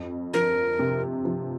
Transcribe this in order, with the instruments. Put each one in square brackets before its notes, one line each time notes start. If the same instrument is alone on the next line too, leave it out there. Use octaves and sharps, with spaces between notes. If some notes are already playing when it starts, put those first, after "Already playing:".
Already playing: [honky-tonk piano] F2
[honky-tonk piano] F3 [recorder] A#4
[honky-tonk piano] C3
F3